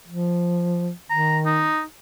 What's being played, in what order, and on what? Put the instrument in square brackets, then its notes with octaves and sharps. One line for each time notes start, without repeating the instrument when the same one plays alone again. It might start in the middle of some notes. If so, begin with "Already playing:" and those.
[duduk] F3
[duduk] D#3 [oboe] A#5
[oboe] D#4